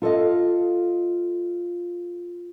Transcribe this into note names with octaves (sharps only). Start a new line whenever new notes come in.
F4 A4 C5 D#5 F5